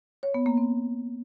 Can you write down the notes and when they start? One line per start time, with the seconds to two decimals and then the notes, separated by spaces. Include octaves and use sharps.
0.23 C#5
0.34 B3
0.46 A#3
0.58 C4